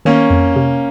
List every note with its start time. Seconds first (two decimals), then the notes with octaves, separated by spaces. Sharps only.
0.05 D#3 A#3 C#4
0.30 F2
0.56 C3